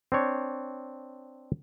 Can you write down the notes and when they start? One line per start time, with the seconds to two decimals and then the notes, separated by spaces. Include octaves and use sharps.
0.12 C4 D4 C#5